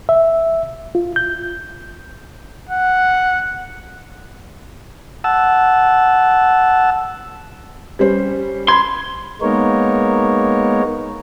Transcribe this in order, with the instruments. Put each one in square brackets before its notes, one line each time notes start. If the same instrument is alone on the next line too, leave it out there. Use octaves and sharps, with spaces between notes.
[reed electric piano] E5
F4
G6
[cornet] F#5
[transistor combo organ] F#5 A5 E6
[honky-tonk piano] G3 C#4 [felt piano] B4 C5
[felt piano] B5 G#6 [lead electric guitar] C6
[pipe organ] G#3 A#3 B3 D#4 A#4 C#5